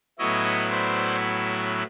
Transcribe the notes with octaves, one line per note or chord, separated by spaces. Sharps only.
A2 F#3 B3 E4 C#5 D#5
C5 D5